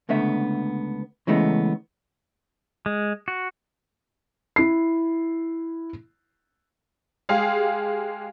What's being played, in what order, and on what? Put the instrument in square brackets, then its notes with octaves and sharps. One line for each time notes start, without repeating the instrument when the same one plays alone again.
[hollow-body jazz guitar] C#2 D3 A3 B3 E5
C#3 E3 G#3 A3 B3
[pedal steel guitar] G#3
F#4
[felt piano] E4 C7
[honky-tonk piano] G#3 G4 G#4 F5